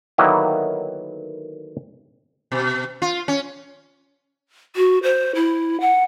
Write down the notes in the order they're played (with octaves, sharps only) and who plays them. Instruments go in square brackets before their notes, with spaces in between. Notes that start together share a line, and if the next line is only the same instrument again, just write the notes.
[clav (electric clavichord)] D3 D#3 F#3 A#3 B3 E4
[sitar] B2
F4
C#4
[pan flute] F#4
C5
E4
F#5